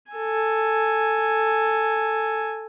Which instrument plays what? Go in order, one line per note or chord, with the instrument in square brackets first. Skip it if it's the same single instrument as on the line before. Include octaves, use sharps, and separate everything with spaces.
[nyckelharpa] A4 G#5